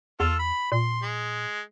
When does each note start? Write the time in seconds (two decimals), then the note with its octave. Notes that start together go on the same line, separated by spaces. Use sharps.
0.20 E2 F4 A4
0.39 B5
0.72 A#2 C6
1.03 G#3